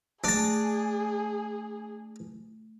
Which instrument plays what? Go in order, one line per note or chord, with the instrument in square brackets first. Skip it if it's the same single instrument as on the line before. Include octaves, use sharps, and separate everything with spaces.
[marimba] A3 [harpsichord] D4 A5 [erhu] G#4